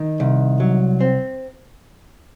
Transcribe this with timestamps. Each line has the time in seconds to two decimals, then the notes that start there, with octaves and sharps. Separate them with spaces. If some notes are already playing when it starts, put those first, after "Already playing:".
Already playing: D#3
0.20 C2
0.60 F#3
1.00 C4